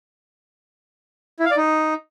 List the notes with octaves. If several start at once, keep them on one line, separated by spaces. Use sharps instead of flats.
E4
F5
D5
D#4